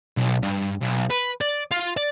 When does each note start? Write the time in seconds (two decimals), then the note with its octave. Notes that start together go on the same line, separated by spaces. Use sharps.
0.17 B1
0.43 G2
0.81 B1
1.10 B4
1.41 D5
1.71 F4
1.97 D5